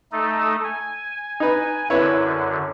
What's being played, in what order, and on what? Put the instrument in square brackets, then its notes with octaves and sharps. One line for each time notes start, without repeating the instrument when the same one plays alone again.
[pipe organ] A3 D#4 A4
G#5
[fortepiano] D#4 B4
[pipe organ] F#2 D3 [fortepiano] E4 B4 C#5